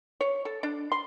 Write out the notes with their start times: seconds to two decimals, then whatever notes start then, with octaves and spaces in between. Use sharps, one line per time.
0.21 C#5
0.45 A4
0.63 D4
0.92 C6